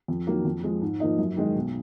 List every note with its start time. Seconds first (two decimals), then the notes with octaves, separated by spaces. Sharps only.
0.08 F2
0.27 D#3 F#3 A#3
0.45 F2
0.63 F3 G#3
0.82 G#2
1.00 F3 A#3 D#4
1.19 F#2
1.37 D#3 G#3 D#4
1.56 B1